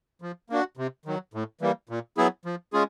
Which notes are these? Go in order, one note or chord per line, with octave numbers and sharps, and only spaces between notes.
F3
A#3 D4 F#4
C3
D#3 F#3
A2
E3 G3 A#3
A#2
F#3 B3 E4 G#4
F3
G#3 C#4 F4 G#4